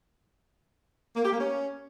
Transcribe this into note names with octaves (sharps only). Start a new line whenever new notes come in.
A#3
G4
A#3
C#4